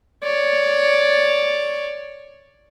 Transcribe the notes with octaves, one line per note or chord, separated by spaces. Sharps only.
C#5 D5